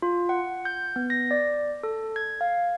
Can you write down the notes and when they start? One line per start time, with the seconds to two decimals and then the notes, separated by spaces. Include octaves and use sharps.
0.02 F4
0.29 F#5
0.65 G6
0.96 B3
1.10 A#6
1.31 D5
1.83 A4
2.16 G#6
2.41 F5